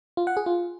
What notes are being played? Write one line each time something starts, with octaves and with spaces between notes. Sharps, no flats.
F4
F#5
G#4
F4